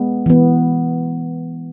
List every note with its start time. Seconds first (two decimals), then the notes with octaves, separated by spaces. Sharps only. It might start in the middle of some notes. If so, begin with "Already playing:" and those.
Already playing: G#3 B3
0.26 E3 B3